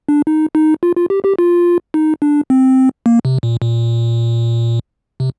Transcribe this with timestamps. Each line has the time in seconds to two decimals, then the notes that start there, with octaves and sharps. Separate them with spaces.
0.09 D4
0.27 D#4
0.55 D#4
0.83 F4
0.96 F4
1.10 G4
1.24 G4
1.39 F4
1.94 D#4
2.22 D4
2.50 C4
3.06 A#3
3.25 C3
3.43 A#2
3.62 A#2
5.20 C3